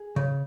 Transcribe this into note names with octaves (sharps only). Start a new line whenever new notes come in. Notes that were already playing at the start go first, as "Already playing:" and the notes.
Already playing: G#4
C#3